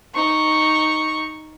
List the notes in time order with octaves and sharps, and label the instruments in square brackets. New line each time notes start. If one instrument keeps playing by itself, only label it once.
[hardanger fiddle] D#4 C#6